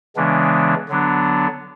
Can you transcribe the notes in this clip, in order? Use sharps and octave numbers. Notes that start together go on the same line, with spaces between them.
C#3 E3 G#3 B3 D4
D3 F#3 B3 D4